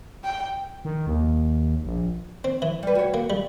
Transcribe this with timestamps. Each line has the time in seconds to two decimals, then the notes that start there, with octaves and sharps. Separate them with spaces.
0.24 G5
0.85 D#3
1.07 D#2
1.85 A#1
2.44 C4
2.62 E3
2.83 G3 B4
2.95 F#4 C#5
3.14 A#3
3.30 G3